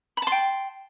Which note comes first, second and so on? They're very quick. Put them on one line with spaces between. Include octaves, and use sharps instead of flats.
B5 A5 C6 G5